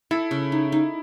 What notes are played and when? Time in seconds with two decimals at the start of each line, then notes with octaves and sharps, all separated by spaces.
0.11 E4 A4
0.31 C#3
0.52 D#4
0.72 D#4